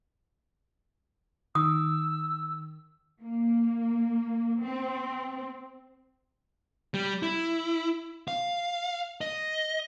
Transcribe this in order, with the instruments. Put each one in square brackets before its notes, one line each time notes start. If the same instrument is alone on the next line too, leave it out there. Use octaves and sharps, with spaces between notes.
[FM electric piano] D#3 [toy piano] D#6 [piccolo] E6
[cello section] A#3
C4
[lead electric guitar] G3
E4
F5
D#5